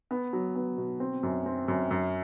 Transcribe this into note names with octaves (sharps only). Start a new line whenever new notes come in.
B3
F#3
B3
B2
C4
F#2
C4
F#2
F#2